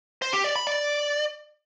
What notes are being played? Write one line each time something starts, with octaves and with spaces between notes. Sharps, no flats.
C5
G4
D5
B5
D5